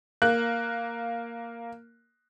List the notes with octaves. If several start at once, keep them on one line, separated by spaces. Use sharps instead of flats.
A#3 F#6